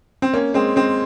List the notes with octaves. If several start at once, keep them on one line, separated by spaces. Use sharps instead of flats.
C4
A#3 C#4
G#3 C4
G#3 C4